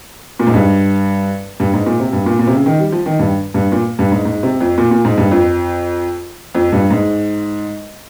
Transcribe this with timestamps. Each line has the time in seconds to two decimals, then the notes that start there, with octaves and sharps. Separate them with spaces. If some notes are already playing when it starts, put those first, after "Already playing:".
0.40 A#2
0.47 G#2
0.54 G2
1.60 G2
1.73 G#2
1.86 A#2
2.00 C3
2.13 G2
2.26 A#2
2.39 A#2
2.47 C3
2.53 C#3
2.66 D#3
2.79 G3
2.92 F3
3.06 D#3
3.19 G2
3.54 G2
3.72 A#2
3.99 G2
4.12 G#2
4.25 G#2
4.43 C3
4.61 F2
4.78 A#2
4.91 A#2
5.05 G#2
5.18 G2
5.31 F2
6.55 F2
6.72 G2
6.90 G#2